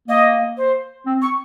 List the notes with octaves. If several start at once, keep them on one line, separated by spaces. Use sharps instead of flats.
A#3 D#5
C5
C4
C#6